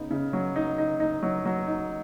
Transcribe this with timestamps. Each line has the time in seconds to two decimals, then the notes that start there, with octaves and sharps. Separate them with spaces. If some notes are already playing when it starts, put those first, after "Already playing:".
Already playing: C#3 B3 D#4
0.11 C#3
0.33 F#3
0.56 D#4
0.78 D#4
1.00 D#4
1.23 F#3
1.45 F#3
1.68 D#4